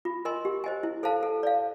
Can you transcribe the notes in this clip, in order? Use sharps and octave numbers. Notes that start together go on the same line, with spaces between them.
F4
A#4 D#5 G#5 C6
G4
C5 D#5 G#5
E4
A4 C5 F5 A5
A4
D5 F5